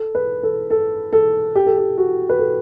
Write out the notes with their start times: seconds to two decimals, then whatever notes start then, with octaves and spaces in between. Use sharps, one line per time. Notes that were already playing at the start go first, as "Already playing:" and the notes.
Already playing: A4
0.15 B4
0.43 A4
0.70 A4
1.13 A4
1.55 G4
1.66 A4
1.78 G4
1.98 F#4
2.29 B4
2.39 A4